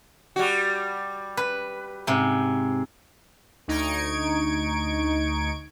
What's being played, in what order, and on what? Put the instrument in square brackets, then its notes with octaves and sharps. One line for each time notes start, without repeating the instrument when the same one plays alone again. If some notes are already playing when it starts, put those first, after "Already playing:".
[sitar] G3 F#4
[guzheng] B4
G#2 C3
[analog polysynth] D2 D#4 C#6 G#6 D7